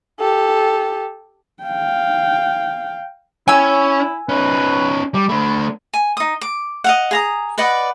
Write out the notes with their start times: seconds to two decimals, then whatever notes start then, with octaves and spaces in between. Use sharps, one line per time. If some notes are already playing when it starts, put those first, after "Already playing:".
0.20 G4 A4
1.63 F5 G5
3.48 C#4 E4 G#5 E6
4.29 C#4 D#4 B4
5.14 G3 D6
5.29 A3 D4 B5
5.94 G#5
6.17 D#4 D#6
6.41 D6
6.84 D#5 F5 F#5
7.11 G#4 A#5 D#6
7.58 B4 D5 D#5 F#5